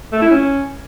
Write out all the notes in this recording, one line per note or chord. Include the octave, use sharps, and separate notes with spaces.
A3
E4
C#4